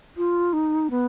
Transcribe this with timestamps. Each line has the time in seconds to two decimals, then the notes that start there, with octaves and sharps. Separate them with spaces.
0.17 F4
0.53 D#4
0.91 B3